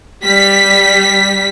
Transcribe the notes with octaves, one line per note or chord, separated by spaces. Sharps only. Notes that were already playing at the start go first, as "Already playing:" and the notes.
G3 B6